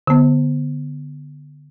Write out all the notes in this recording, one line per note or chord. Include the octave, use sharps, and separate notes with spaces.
D3 B3